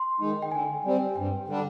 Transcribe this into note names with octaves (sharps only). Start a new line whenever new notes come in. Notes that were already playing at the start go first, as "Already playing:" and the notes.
Already playing: C6
D#3 G#3 D#4
G5
D3 G#5
G3 C4
G2 G5
D3 G3 D4